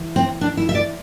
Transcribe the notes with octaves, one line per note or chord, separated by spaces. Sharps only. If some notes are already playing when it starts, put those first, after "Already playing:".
Already playing: E3
C4
D4
E4
E5
D5